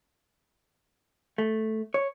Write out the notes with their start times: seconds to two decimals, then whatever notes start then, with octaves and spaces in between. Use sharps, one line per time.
1.38 A3
1.94 C#5